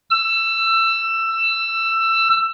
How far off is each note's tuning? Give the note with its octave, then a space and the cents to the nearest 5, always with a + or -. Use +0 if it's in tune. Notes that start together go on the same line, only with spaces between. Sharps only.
E6 +20